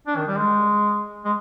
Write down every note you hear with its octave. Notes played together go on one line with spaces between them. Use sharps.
D4
D#3
G3
G#3
G#3